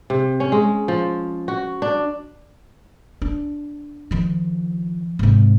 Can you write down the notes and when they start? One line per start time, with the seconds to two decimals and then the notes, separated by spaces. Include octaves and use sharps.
0.10 C3
0.40 C#4
0.52 G#3
0.88 F3
1.48 F#4
1.82 D4
3.22 D4
4.11 D#3 F3
5.19 G#2 C3